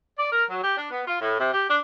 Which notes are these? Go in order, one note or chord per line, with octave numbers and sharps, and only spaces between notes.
D5
A#4
F#3
G4
D4
B3
F4
A2
C3
G4
D4